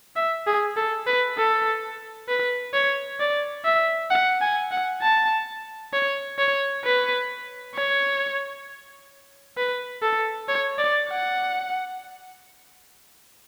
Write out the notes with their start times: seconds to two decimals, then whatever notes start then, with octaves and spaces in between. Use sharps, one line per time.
0.16 E5
0.47 G#4
0.77 A4
1.07 B4
1.38 A4
2.29 B4
2.74 C#5
3.20 D5
3.65 E5
4.11 F#5
4.42 G#5
4.72 F#5
5.02 A5
5.93 C#5
6.39 C#5
6.85 B4
7.75 C#5
9.58 B4
10.03 A4
10.48 C#5
10.79 D5
11.10 F#5